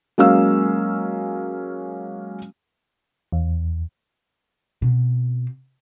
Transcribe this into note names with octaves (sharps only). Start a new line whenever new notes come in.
F#3 G#3 A#3 C#4 F5 E6
E2
B2 C4